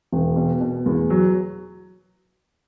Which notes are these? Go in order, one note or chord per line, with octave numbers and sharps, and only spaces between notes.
E1
B2
B2
E2
F#3